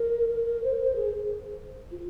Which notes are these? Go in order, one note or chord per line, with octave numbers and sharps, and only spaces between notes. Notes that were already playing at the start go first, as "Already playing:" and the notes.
Already playing: A#4
A#4
C5
A#4
C5
G#4
F4